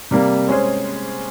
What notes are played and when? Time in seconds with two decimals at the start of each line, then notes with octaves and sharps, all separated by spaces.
0.11 C3 G3 A#3
0.48 G#3 C#4 G#4 C5